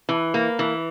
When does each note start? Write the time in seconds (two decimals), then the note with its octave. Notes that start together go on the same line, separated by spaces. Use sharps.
0.09 E3
0.34 A#3
0.59 E3